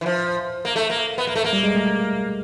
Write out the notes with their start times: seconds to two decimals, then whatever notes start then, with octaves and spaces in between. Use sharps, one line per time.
0.01 E3
0.06 F3
0.65 A#3
0.76 A3
0.90 A#3
1.18 B3
1.27 A#3
1.35 A3
1.44 A#3
1.53 G3
1.63 G#3
1.75 A3